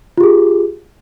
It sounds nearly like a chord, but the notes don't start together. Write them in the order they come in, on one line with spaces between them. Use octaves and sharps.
F4 G4 G#4